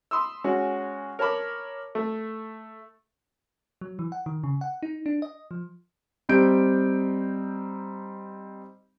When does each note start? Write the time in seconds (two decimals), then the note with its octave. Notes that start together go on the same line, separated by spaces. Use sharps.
0.11 B5 C6 D#6 E6
0.44 G#3 C#4 F#4
1.19 A#4 C#5 A5 B5 D6
1.95 A3
3.81 F#3
3.99 E3
4.12 F#5
4.26 D#3
4.44 C#3
4.61 F#5
4.83 D#4
5.06 D4
5.22 D#5
5.51 F3
6.29 G3 C4 D#4 G6 D7